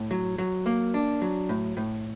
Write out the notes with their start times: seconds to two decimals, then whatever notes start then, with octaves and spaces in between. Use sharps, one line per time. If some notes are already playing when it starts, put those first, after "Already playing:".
Already playing: A2
0.11 F#3
0.38 F#3
0.66 A#3
0.94 D4
1.22 F#3
1.49 A2
1.77 A2